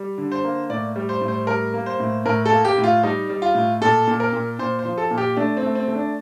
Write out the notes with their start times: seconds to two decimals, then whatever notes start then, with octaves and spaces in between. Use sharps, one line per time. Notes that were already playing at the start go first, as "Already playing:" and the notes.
Already playing: G3
0.18 D3
0.32 C5
0.44 A#3
0.69 A2 D5
0.96 G3
1.09 C5
1.21 A2
1.28 C5
1.47 G3 A#4
1.74 A#3
1.86 C5
2.00 A2
2.26 A2 A#4
2.45 A4
2.51 A#3
2.65 G4
2.78 A2
2.84 F4
3.03 G3 D#4
3.30 G3
3.42 F4
3.55 A2
3.81 A#2 A4
4.07 A#2
4.20 A#4
4.33 A#2
4.59 A#2 C5
4.79 C5
4.85 F3
4.98 A4
5.11 A#2
5.18 G4
5.37 A3 D4
5.57 C4
5.63 A3
5.75 C4
5.88 A3
5.95 D4